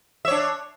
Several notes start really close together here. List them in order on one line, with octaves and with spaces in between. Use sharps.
E5 C#5 D4